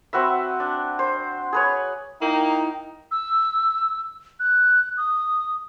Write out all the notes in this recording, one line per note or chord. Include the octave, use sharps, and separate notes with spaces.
C4 F#4 B4 E5
D4
C5
G#4 B4 C#5
A#3 D#4 E4 G5
E6
F#6
D#6